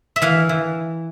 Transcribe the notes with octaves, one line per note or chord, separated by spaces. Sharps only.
E5
E3 F5
E3